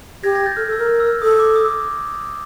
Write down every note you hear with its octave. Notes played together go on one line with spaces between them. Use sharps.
G4 G#6 A#6
G#6 A#6
G6 A6
A4 F6
A4
E6
A#4
F6
E6
F6
A4 D#6
D6
D#6
D6